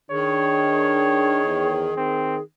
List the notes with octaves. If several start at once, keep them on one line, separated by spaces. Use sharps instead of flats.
D#3 D4 G#4 C#5
E2
D#3 C4